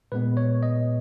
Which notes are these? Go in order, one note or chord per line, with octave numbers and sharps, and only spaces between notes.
A#2 G#3 B3 B4
C#5
D#5